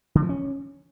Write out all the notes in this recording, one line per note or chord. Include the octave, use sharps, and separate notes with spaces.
D3
F3
C#4